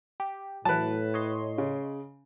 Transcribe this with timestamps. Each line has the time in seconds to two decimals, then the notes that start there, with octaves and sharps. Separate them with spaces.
0.20 G4
0.65 A2 E3 F#3 B4 A5
1.14 C#5 D#5 C6
1.58 C#3